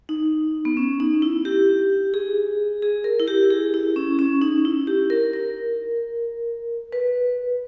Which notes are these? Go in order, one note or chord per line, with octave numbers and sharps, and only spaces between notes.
D#4
B3
C#4
D#4
E4
G4
G#4
G#4
A#4
E4
G4
G#4
E4
C#4
C#4
D#4
E4
G4
A#4
A#4
B4